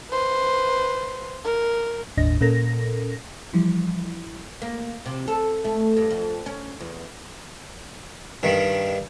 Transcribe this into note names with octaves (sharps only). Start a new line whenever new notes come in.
B4 C5
A#4
G1 D#2 A2 D4 D#5 A#6
A#2 C#4 A4 A#4 A#6
E3 F3 G3 E4
A#3
C3
A4
A3
G2
F2
C#4
E2
G2 D#3